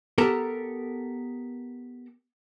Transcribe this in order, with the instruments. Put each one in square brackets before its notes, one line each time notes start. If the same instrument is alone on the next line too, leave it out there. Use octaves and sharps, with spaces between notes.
[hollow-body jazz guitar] B3 G4 A4 A#4 A5 A#5